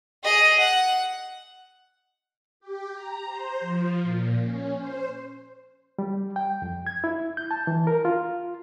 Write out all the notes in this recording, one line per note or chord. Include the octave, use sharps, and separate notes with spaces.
G#4 D#5
F#5
G4
A#5
C5
F3
A#2
C#4
C5
G3
G5
F2
G#6
E4
G6
A5
E3
A#4
F4